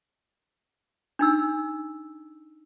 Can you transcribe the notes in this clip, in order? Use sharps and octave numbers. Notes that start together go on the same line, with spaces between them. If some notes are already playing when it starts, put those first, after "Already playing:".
D4 D#4 E6